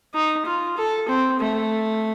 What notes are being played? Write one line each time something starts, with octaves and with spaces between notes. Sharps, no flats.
D#4
F4
A4
C4
A3